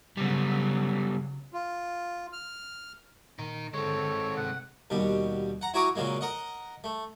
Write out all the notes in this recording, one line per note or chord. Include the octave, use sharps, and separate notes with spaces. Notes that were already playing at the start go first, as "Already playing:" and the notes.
C#3 F#3 G3 B3
F4
F6
A#2 D#4 A#4
D3 G#3 C4 A4 C#5
C3 F#5
D#2 B2 G3
F#5 A#5
E4 F#4 C#5 A#5 D6 D#6
A#2 C#3 F#3 G#3 A#3
A#4 D#5 F#5
A3